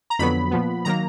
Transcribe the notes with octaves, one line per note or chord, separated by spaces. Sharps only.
A#5
F2 D3 F#3 B3 B5
A#2 F3 B3
D#3 F#3 A#3 A#5